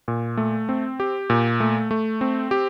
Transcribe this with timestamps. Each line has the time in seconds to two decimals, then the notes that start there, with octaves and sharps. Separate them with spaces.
0.08 A#2
0.37 A3
0.69 C4
1.00 G4
1.30 A#2
1.60 A3
1.91 A3
2.21 C4
2.51 G4